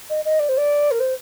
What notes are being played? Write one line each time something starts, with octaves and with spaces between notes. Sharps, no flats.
D#5
D#5
D5
C5
D5
A#4
C5